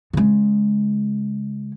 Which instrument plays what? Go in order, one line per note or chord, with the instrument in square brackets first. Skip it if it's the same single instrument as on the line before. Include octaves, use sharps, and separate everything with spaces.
[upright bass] C#3 G#3